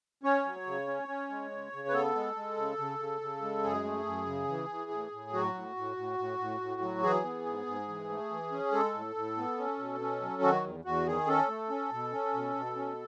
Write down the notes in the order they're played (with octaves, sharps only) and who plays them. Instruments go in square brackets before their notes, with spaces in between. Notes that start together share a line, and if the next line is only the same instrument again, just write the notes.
[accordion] C#4 C#5
F#3
C#3
C#4
C#4
G#3
C#3
C#3
B4
B3 A4
G#3
G#3
C#3
C#3
C#3
C#3
G#3
F#2 G#4
A3
F#2
C#3
E3
E3
A2
A2
F#3 F#4
A2
A2
A2
A2
A2
A2
F#3
E3 G#4
B3
G#2
G#2
E3
A3
E3
C#4
G#3 A4
A2
A2
B3
C#4
B2
C#4
F#3
D#3 F#4
E2
E2 F#4
D#3 G#4
C#4 A4
A3
C#4
B2
C#4
B2
B2
C#4